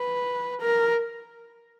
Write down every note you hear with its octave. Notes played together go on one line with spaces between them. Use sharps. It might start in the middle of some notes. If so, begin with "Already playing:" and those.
Already playing: B4
A#4